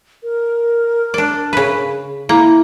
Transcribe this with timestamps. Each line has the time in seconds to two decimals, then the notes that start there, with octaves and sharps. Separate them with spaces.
0.24 A#4
1.14 D4 D5
1.53 C#3 B4
2.29 A#3 E4